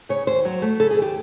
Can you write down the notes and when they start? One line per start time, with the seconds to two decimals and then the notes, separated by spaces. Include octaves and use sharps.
0.09 C#3 C#5
0.27 D#2 C5
0.45 F#3
0.62 A3
0.80 C#3 A4
0.91 G#4
0.97 D#2 G4